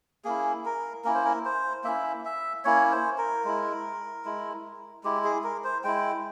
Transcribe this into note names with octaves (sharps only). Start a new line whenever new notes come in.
A#3 C#4 E4 G#4
A#4
A#3 C#4 E4 A#4
C5
A#4
C5
A#3 C#4 E4 E5
E5
A#3 C#4 E4 C#5
C5
A#4
G#3 E4
G#3 E4
G#3 E4 G4
G#4
A#4
C5
G#3 E4 G5